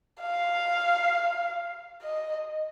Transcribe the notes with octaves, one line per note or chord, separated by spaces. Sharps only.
F5
D#5